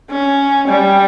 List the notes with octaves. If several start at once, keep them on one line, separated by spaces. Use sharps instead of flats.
C#4
G3